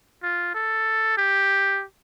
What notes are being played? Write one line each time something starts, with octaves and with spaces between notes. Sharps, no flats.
F4
A4
G4